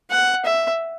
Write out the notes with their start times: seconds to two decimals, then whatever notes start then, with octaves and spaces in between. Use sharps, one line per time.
0.11 F#5
0.45 E5